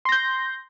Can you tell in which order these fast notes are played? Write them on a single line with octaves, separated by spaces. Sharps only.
C6 A#6 G6